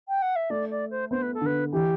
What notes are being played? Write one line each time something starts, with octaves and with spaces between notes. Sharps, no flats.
G5
F#5
E5
A3 D5
D5
C5
B3 C5
B4
A4
D3 B4
E3 G4